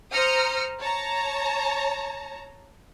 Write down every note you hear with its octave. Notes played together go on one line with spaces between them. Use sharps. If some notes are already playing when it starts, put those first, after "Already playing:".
C5 A#5 D#6 F6 C#7
C#5 A5 A#5